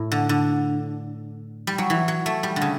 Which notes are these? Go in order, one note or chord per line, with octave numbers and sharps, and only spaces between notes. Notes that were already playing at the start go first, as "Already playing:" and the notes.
Already playing: A2
D3
D3
G3
F#3
E3
F#3
A3
G3
D3
C#3